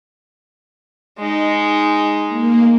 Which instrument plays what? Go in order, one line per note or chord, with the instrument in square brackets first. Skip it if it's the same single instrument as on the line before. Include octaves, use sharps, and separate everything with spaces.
[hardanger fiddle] G#3 D#4
[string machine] A#3